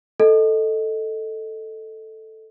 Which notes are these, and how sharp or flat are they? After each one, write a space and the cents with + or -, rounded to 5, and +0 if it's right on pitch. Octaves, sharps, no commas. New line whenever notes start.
A4 +0 D#5 +0